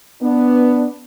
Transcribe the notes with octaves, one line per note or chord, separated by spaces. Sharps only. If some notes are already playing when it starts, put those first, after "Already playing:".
B3 D4